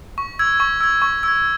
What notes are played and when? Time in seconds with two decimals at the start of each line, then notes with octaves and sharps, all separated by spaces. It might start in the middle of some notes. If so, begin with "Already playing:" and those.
0.18 C#6
0.39 E6 G#6
0.60 C#6
0.81 E6 G#6
1.02 C#6
1.23 E6 G#6